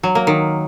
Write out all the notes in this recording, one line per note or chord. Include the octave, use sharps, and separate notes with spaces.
F#3
A#3
D#3